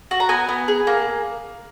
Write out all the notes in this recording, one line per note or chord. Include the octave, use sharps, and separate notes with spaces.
F#4
A#5
B3 G#5
B3
G#4
A#3